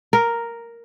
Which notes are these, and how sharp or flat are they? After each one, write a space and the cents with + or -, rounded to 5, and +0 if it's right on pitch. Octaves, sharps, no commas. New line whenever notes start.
A#4 +0